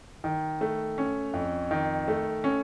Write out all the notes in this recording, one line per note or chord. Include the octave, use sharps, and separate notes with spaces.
D#3
A3
C#4
F2
D#3
A3
C#4